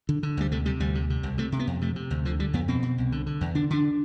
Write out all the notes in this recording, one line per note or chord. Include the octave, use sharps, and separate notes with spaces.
D3
D3
D2 G3
C3 A3
C3 G3
D2 G3
C3
C3
C2
C3 A3
C3
B3
F2
C3 A3
C3
D2
D3 F3
D3 G3
F2 B3
B2 C4
B2
C2
D3
D3
E2
D3 D4
D3 D4